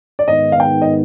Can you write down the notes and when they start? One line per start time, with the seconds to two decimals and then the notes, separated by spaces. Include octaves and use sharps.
0.19 D5
0.27 G#2 D#3 B3 D#5
0.52 F5
0.60 G5
0.82 D#5